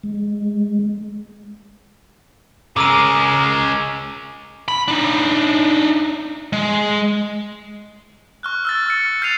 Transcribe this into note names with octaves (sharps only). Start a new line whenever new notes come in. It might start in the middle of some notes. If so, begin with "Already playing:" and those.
G#3
C#3 G#3 A#4 D6 E6 D#7
B5
D4 D#4
G#3
C#6 F6 F#6
E6 F6 A6
C#6 F6 C#7
F6 G6 A6 C7 D#7 F7